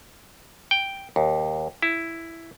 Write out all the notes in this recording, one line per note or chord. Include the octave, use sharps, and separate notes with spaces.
G5
D#2
E4